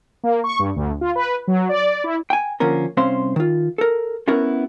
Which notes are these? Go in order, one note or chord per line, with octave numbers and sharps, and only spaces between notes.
A#3
C#6
G2
D2
F4
B4
F#3
D5
E4
G5 G#5
D3 F3 A#3 C#4 A#4
C2 C4 C#4 C5 F5 C6
D#3 F4
A4 A#4
B3 C#4 E4 F#4 A#4